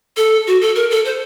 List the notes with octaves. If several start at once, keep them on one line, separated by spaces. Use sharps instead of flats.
A4
F#4
A4
A#4
A4
C5